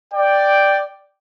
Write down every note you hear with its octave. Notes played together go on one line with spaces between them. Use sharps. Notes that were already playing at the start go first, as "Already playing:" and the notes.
D5 G5